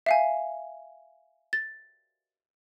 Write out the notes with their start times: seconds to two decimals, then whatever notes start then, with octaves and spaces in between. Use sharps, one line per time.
0.06 E5 F5 G#5
1.53 A6